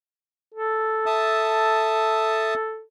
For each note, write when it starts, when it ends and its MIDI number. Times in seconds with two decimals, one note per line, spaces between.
0.54 2.81 69
1.06 2.54 76
1.06 2.54 81
1.06 2.54 87